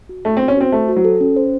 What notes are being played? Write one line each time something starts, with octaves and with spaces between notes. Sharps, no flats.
F#4
A3 A4
C4
C5
C#4
C4 F#4
A3 C5
F#4
F#3
A4
C#4
C5